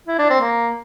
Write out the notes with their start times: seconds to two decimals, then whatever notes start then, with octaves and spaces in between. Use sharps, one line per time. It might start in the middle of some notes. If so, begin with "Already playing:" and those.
0.07 E4
0.19 D4
0.30 C4
0.41 A#3